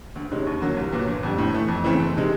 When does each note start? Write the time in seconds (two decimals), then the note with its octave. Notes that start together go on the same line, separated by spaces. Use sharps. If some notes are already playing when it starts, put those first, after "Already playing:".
0.16 D2
0.31 C3 D#3 G#3 C#4
0.47 D#2
0.61 D3 F#3 A#3
0.77 C2
0.92 A#2 F#3 B3
1.08 G1
1.23 F2 D3 G3
1.38 A2
1.53 E3 A3
1.68 F2
1.84 C#3 E3 A3 C4
1.99 F#1
2.16 C3 D#3 G#3